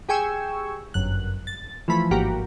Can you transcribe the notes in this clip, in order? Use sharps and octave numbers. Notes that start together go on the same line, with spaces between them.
G4 G#4 G5 G#5 C#6 E6
G1 F#2 F#6
A6
E3 F3 A3 B5
G#1 G2 A#3 F#4 G4 A#4